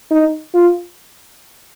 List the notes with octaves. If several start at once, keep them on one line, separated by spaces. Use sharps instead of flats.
D#4
F4